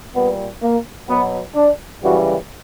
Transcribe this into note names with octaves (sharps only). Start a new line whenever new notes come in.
A#2 G3 B3
A#3
B2 F#3 B3
D4
F#2 C#3 E3 G3 F#4